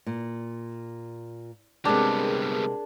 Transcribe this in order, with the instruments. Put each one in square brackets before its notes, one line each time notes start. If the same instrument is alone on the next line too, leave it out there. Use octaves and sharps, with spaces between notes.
[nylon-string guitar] A#2
[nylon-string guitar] C3 G#3 [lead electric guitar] G3 B3 [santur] D4 [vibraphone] G#4 A#4